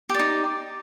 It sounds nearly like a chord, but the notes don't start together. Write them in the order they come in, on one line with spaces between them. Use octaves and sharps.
G4 D5 D#4